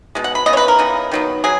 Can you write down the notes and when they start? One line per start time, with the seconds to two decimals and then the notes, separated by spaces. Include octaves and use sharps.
0.15 B2 G#3
0.24 F#5
0.35 B5
0.46 C#3 E3 B3 D#5
0.53 C#5
0.57 B4
0.68 A#4
0.79 C#3 E3 B3
1.12 D#3 F#3 B3
1.44 F#3 G#4